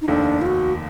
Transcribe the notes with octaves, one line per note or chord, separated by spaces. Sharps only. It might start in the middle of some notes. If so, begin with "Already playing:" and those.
D#4
F1 D#2 D#3 D4
F4
F#4